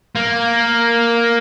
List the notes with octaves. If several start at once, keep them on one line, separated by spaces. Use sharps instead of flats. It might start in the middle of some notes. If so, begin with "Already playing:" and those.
A#3